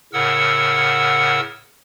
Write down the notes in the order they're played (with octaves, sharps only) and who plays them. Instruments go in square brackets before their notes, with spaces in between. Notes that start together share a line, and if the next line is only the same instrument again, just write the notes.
[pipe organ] A2 C#3 A#4 F#5 E6